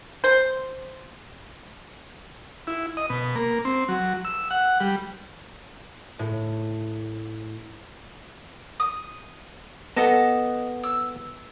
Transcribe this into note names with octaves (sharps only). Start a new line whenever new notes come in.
C5
E4
D#5
B2
A#3
C4
F#3
E6
F#5
G3
A2
D#6
B3 A4 D#5 F#5 A5
E6